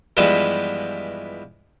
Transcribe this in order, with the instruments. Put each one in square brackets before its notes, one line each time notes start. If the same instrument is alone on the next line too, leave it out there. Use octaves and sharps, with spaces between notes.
[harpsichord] G2 E3 F3 G3 G#3 B3